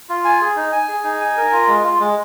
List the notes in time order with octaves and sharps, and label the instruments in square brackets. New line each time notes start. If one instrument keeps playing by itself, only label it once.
[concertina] F4
G#5
G#4
D#4
G#5
G#4
D#4
G#5
A#4
F4
G#3
F4
G#3